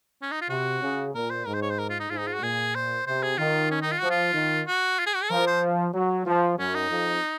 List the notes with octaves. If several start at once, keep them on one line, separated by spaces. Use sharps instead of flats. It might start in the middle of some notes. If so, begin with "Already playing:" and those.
C#4
D#4
F4
C3 F#4
C#3
A#2 A#4
C5
G#2 A#4
C5
C#5
C5
A#4
F4
D#4
G#2 F4
D#4
F4
F#4
A#2 G#4
C5
C3 C5
G#4
D#3 F4
C#4
D#4
F4
F3 F#4
F4
D#3
F#4
F4
G#4
F#4
G#4
F3 A#4
C5
F#3
F3
F#2 C#4
D#4
F2